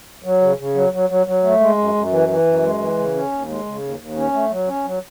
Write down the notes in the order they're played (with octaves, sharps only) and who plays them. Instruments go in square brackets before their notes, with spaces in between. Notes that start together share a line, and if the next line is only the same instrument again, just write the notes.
[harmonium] F#3
C#3
C#3
F#3
F#3
F#3
F#3
A3
G#3
F#2
F#2
E3
E3
F#2
G#3
E3
C#3
C#4
D#2
G#3
C#3
D#2
D#2
C#4
A3
F#3
C#4
F#3